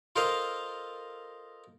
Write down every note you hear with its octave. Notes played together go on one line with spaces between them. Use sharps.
F4 A4 A#4 C5 D#5 F5